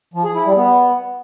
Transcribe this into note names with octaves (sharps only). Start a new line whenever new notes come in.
F3
G#4
E4
G3
B3